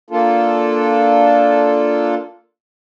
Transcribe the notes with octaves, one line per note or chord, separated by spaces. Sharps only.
A#3 D4 F4 A4